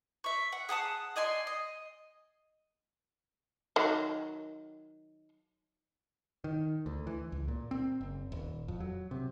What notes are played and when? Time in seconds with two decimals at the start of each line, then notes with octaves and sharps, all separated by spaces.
0.24 E5 C#6
0.52 F#5
0.69 G#4 F#5 A5 D#6
1.16 D5 D#5 G#5 C6
1.47 D#5
3.76 D#3 F#3
6.44 D#3
6.86 D2
7.07 E3
7.32 C#2
7.48 A#2
7.71 C4
8.01 F#1
8.32 D#1
8.68 F2
8.80 F#3
9.11 C3